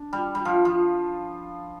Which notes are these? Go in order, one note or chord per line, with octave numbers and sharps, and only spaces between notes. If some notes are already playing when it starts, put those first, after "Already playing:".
Already playing: D4
G3
G3
F3
F3